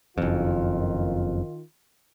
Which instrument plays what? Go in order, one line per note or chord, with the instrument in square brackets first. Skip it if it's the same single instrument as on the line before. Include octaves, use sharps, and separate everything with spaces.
[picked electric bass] F#1 F2 [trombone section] D#3 F4